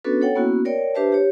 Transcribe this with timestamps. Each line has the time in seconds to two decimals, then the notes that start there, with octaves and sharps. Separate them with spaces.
0.04 B3 C#4 D4 F#4 A4 B4
0.21 A4 C#5 F#5 G5
0.35 A#3 B3 C#4 E4 F#4
0.65 A#4 C#5 D5 G5
0.95 D4 G4 B4 C5 E5 A5
1.12 G4 C#5